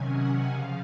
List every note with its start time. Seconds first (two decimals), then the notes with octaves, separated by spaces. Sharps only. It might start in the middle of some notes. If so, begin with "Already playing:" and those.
Already playing: C3 D#3 F#3 C#4 G#5
0.10 F#5
0.51 C#3 F3 F5